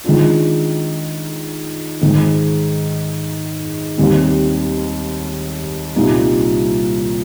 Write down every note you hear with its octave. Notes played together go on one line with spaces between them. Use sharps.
D#3 G#3 D4 F4
G#2 D#3 G#3
D#2 D#3 G3 C4
C2 A#2 G3 A#3 D#4